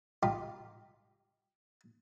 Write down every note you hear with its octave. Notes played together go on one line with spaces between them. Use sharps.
D#4 F4 G4 F5 G5 B5